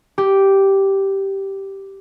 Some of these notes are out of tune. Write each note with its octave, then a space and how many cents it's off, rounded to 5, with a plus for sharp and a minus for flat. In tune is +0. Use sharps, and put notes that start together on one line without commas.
G4 -5